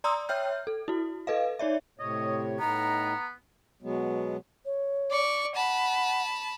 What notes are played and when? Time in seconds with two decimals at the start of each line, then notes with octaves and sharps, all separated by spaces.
0.04 D5 A#5 C6 D#6 E6
0.29 C#5 E5 G5 F6 G6
0.67 A4
0.88 E4 F#4
1.27 A4 B4 D#5 F5
1.59 D#4 C#5 D5 E5
1.99 A2 C3 C#5 D#5
2.59 A2 B3 D#4 A#5
3.83 B2 F#3 G#3 B3
4.66 C#5
5.11 D5 C#6
5.55 F#5 A5 B5